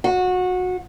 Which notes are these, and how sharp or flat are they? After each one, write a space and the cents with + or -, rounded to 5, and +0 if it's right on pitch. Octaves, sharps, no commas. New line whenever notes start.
F#4 -20